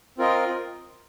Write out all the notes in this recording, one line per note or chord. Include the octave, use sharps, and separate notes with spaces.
C4 F4 A#4 D#5